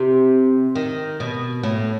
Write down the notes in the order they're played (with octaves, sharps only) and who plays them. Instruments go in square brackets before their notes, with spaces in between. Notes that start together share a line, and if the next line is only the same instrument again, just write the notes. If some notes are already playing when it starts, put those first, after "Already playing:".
Already playing: [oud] C3
D#3
B2
A2